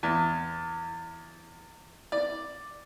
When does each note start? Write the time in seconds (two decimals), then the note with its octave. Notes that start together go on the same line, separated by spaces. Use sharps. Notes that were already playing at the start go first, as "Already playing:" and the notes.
0.03 E2
2.12 D5